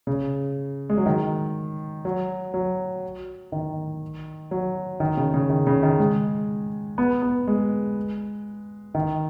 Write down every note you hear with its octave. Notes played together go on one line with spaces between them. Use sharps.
C#3
G#3
F#3
D#3
F#3
F#3
D#3
F#3
D#3
C#3
C#3
D#3
C#3
D#3
G#3
B3
B3
G#3
D#3